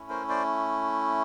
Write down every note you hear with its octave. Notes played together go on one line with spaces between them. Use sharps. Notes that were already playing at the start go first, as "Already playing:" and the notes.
Already playing: A3 C#4 E4
A#4 C5
C5 D5